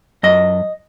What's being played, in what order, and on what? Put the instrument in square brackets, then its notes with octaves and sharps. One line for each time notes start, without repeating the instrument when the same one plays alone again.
[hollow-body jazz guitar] F#2 D#5